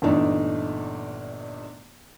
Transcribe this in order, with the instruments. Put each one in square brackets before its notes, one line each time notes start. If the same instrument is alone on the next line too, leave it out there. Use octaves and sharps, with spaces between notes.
[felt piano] G1 A#2 E3 A3 D4 D#4